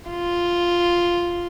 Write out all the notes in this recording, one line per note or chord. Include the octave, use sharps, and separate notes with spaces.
F4